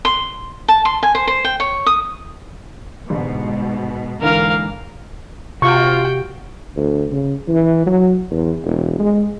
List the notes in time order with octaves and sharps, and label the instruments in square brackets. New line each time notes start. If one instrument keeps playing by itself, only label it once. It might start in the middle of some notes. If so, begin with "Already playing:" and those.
[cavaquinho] C6
A5
C6
G#5
C5
C5
G5
C#5
D#6
[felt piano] G1 [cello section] G#2 B2
[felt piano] G#2 D3 E3 [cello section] A#3 [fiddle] A#4 F5
[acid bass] C3 [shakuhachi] F4 [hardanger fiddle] F#4 G5 [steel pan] C#6
[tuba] D2
C#3
E3
F#3
E2
E1
G#3